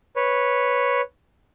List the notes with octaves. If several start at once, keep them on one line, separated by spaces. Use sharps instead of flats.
B4 C#5